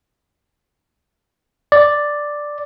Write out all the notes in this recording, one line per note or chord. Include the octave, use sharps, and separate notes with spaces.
D5